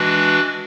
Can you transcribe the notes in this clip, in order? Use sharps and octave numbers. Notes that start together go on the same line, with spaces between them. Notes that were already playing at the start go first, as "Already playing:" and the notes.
Already playing: E3 G#3 D4 F#4 B4